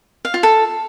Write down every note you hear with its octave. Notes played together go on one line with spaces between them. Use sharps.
F5
F4
A4